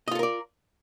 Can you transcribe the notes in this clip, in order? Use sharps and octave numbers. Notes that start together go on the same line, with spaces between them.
F4 A4 A#4 D5 D#5